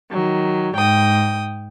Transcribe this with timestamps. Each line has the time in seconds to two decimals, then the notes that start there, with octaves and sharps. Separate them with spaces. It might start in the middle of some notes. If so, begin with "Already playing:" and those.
0.11 D#3 F#3
0.76 G#2 G5 D#6